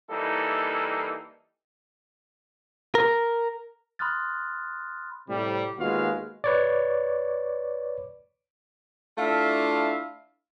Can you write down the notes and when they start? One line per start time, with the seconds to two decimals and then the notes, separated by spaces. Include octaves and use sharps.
0.10 E3 G3 A#3 D#4 E4 A4
2.95 A#4
3.99 B5 C6 D#6 F6 F#6 A6
5.29 A2 C3 G3
5.79 D#2 G#3 B3 F4 F#4 F5
6.44 B4 C#5 D5
9.18 A3 D4 E4 F4 E5 F5